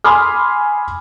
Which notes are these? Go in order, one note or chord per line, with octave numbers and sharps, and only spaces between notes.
G#5 B5 C6 D6 D#6 F6